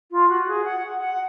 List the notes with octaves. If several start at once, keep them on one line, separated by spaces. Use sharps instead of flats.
F4
F#4
G#4
F#5
F#5